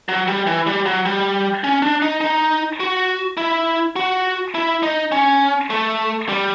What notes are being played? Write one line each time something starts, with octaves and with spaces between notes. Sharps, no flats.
F#3
G3
E3
G3
F#3
G3
C#4
D4
D#4
D#4
F#4
E4
F#4
E4
D#4
C#4
A3
G3